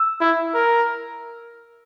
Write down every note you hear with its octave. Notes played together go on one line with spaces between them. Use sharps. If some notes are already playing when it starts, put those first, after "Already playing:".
Already playing: E6
E4
A#4